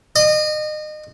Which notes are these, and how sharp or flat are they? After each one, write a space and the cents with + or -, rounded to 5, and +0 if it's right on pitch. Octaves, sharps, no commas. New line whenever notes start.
D#5 -30